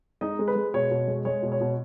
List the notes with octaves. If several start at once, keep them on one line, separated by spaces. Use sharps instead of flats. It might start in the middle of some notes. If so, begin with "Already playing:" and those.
G#3 D#4 D#5
G#3
B4
G#3
B2 C#5
B2
G#3
G#3 C#5
B2
C#5
B2